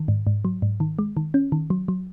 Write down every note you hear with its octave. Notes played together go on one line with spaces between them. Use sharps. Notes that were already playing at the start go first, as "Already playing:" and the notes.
Already playing: D#3
G#2
G#2
F#3
G#2
D#3
G#3
D#3
C#4
D#3
F#3
F#3